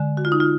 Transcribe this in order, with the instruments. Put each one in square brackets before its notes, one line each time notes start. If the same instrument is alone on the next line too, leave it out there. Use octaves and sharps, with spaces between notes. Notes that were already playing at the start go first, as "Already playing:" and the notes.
Already playing: [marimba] D3 G#3
F#4
F4
D#4
F4